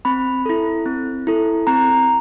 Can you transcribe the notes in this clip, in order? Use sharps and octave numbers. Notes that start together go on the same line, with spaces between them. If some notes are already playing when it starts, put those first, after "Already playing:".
C4 B5
E4 A4
C4
E4 A4
C4 A#5